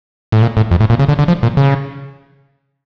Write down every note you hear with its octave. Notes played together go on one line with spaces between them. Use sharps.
A2
A#2
A2
F2
A2
A#2
C#3
D3
D3
F3
A#2
C#3